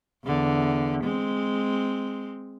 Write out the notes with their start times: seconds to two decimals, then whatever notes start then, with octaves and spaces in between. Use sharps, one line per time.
0.25 E2 D3
1.03 G#3 C4